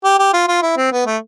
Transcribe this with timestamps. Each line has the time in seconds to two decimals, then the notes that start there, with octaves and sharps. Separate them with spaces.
0.04 G4
0.19 G4
0.33 F4
0.48 F4
0.62 E4
0.77 C4
0.92 B3
1.06 A3